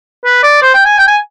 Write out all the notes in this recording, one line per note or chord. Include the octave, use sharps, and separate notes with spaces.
B4
D5
C5
G5
G#5
G5
G#5